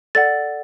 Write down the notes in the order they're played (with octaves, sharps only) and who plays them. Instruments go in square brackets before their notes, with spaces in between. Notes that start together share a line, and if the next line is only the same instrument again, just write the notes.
[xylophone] A4 D5 F#5 A6